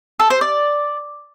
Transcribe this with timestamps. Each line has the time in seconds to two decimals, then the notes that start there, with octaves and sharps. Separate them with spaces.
0.20 A4
0.30 C5
0.41 D5